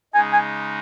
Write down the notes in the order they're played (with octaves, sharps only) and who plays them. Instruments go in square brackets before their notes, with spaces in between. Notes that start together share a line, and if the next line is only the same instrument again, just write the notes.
[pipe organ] C#3 G#3 D#4 [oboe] G#5
[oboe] G#5